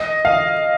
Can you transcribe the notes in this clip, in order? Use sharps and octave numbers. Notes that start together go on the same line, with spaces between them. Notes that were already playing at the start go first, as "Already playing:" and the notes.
Already playing: D#5
F5